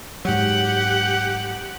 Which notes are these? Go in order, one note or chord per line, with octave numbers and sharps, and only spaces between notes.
G#2 F#3 G4 F#5